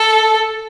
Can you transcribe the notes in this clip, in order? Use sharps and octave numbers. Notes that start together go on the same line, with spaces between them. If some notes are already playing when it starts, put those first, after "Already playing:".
Already playing: A4